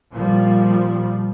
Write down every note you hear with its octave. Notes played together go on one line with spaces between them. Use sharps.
A#2 F3 G3